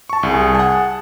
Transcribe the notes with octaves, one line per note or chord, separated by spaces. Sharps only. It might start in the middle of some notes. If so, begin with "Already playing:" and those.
A5 C#6
C2 G#4
F#5 A5